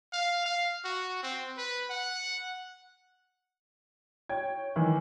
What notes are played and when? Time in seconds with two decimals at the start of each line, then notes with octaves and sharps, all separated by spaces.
0.12 F5
0.46 F5
0.84 F#4
1.23 C4
1.57 B4
1.90 F#5
4.29 C#5 G5 G#6
4.76 D#3 E3